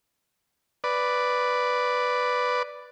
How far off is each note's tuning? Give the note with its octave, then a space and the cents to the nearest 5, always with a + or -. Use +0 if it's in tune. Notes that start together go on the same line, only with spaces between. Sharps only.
B4 +0 D5 +0